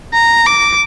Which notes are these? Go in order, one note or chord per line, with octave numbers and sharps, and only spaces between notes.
A#5
D6